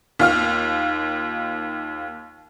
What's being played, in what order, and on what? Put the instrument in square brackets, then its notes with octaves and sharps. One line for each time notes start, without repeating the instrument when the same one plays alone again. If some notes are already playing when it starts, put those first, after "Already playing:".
[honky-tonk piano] D#2 F4 F6